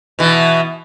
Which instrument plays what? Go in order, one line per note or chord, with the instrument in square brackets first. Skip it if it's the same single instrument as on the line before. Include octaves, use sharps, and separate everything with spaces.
[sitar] B2 E3